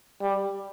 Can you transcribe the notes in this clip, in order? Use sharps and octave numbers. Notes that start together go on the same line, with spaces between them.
G3